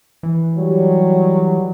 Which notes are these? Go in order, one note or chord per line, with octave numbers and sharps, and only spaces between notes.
E3
F#3 G3